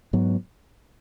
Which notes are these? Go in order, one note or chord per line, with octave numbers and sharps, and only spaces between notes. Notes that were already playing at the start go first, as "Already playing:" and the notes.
G#2 F#3 B3